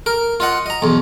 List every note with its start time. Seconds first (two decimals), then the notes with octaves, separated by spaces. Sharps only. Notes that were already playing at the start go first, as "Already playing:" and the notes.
0.06 A#4
0.40 F4 D#5 F#5
0.66 D#5 A#5
0.82 B1 E2